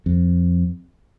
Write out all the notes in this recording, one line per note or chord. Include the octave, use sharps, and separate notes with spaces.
F2